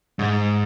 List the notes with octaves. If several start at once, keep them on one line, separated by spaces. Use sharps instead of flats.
G#2